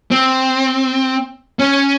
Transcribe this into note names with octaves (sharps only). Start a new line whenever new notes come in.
C4
C#4